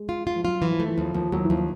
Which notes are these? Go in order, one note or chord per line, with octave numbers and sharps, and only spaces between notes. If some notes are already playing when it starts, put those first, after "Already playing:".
Already playing: G#3
F4
F4
F3
F#3 F4
E3
F3
A3
E3
D#2 F3
D#2 F3
D#2 F#3
E3
D#2 F3